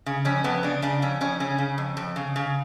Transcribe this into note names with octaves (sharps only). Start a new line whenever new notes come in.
C#3
F2 C#4
F2 B3
C#3 D4
C#3 D4
F2 C#4
F2 C#4
C#3 C#4
C#3
F2
F2
C#3
C#3